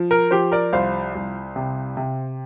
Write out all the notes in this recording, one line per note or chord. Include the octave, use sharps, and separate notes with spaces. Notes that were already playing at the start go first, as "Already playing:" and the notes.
Already playing: F3
A#4
F3 G4 C5
A#4 D5
C2 C5 F5
C2
C3
C3